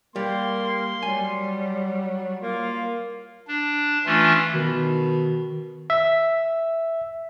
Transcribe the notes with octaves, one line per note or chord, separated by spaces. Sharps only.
G3 A#3 C6
F#3 G3 G#5
A#3 F4
D4
E3 A3 C#4 D4 F4
B2 D#3
E5